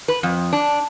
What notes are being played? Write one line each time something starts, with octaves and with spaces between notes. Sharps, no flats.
B4
F2
D4